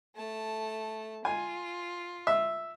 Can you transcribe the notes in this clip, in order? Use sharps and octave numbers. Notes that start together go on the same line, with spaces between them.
A3 A5
F4 G#5
E5